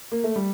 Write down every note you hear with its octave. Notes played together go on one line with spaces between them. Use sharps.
A#3
A3
G3